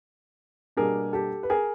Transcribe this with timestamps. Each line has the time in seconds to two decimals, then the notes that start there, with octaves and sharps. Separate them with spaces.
0.77 B2 G3 A#3 D4 G#4 A#4
1.13 G4 A4
1.43 B4
1.50 G#4 A#4